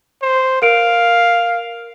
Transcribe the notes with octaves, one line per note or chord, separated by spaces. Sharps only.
C5
A#4 F5 D7